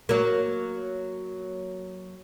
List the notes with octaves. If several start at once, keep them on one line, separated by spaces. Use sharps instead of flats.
F#3 A#3